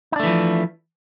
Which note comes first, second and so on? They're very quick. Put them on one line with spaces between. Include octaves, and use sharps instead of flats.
D#4 D4 A3 E3 F3